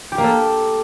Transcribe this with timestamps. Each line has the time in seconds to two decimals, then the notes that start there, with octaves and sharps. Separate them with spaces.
0.12 G4
0.18 A#3
0.24 A4